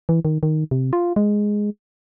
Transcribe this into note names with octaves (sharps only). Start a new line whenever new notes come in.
E3
D#3
D#3
C3
F4
G#3